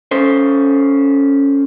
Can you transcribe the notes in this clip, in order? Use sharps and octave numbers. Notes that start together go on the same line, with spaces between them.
C#4 A4 C5